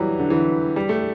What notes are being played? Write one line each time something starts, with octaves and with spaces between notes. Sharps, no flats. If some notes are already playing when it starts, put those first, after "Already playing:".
Already playing: E3 F#3 G3
D3
E3
G3
A3